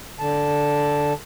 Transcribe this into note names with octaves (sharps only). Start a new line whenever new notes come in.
D3 A5